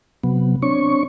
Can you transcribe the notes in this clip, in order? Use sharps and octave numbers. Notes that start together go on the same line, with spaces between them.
C3 F#3 B3
C4 D4 C#5 C#6